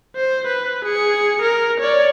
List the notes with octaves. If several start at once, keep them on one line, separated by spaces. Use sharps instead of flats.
C5
B4
G#4 C#7
A#4
C#5 D5